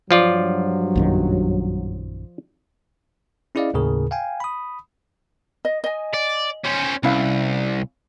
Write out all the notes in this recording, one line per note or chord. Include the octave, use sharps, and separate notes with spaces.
G2 F3 F#3 F4 D5
A#1 F#2 D#3
C#4 E4 G#4 D5 D#5 F5
D#2 A2 C#3 G#4 A#4
F5 G5 G#5
B5 D#6
D#5
D#5 G#5
D5
C#4 C5
C2 C#4 E4 F5